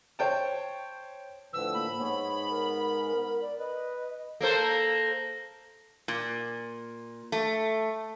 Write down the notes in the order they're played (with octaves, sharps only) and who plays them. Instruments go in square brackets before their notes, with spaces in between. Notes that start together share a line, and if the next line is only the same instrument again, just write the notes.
[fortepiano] C5 C#5 G5 A5
[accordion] A2 D3 F3 [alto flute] B4 [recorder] E6
[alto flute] A#3 [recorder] B5
[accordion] G#2 G#3 B3 [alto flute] C#5
[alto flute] A#4
D5
[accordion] B4 [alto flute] D#5
[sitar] A#3 A4 C5
[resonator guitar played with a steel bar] A#2
A3